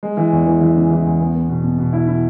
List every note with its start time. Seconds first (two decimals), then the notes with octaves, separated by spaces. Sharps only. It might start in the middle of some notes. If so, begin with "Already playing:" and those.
0.03 G#3
0.17 E3
0.32 E2
0.46 E3
0.61 E3
0.76 C#3
0.91 E3
1.05 E2
1.20 B3
1.34 B3
1.49 B2
1.64 B2
1.78 B2
1.93 E4
2.07 E4